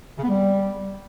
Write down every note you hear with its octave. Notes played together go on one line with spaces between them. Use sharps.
C#3
B3
G3